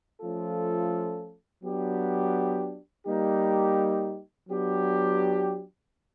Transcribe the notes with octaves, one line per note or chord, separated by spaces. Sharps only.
F3 A3 C#4 F4 A4
F#3 B3 D4 G4
G3 A#3 D#4 G4
F#3 B3 D4 G4